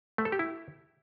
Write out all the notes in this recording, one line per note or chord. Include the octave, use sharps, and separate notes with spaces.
A3
A4
G4
E4